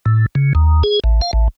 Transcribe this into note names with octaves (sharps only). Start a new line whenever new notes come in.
A2
C#3
D#2
G#4
A1
F5
A1